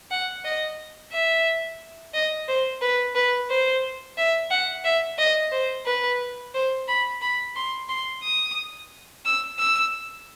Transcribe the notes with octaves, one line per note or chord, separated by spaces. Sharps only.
F#5
D#5
E5
D#5
C5
B4
B4
C5
E5
F#5
E5
D#5
C5
B4
C5
B5
B5
C6
C6
D#6
E6
E6